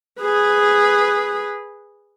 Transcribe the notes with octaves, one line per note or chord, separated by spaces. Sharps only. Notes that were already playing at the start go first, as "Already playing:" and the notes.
G#4 B4